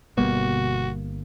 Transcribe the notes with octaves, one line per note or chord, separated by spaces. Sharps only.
G1 B2 G3 A#3 F#4